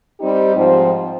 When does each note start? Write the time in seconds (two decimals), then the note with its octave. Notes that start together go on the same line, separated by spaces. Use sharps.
0.18 G3 C4 D#4 G4
0.55 G#2 F3 C4